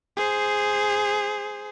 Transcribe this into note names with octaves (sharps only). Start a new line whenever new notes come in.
G#4 C5